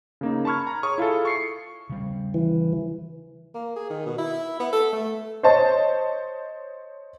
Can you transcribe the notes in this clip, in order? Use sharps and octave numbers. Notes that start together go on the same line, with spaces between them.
C#3 A#3 D#4
A5 B5 C#6 F6 G#6
A#5
G#4 C#5 C#6 D#6
E4 F4 G#4 A4
C#6 C7 C#7
C#3 G3
E3
A#3
G#4
D#3
B2
E4
B3
A4
A3
C5 C#5 D#5 A5